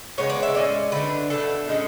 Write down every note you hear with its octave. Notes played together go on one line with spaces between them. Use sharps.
C#3 G#3 B3 C#5
D5
E5
A2 G#3 C#4 D5
D3 A3 D4 B4
B2 A3 D4 A4
A2 G#3 C#4